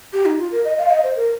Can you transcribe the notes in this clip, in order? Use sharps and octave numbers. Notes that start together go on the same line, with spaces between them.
G4
D#4
F4
A#4
D#5
F5
D#5
C5
A#4